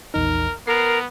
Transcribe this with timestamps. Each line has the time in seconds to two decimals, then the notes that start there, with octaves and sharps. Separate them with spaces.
0.14 A#1 E2 D#4 A#4
0.67 B3 A#4 C7